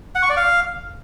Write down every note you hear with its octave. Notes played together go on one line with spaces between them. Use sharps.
F#5
C#6
D5
F5